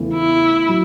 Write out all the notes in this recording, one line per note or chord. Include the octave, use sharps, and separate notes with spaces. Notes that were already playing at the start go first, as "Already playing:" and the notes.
Already playing: E2 C#3 E3 A3
E4
F#3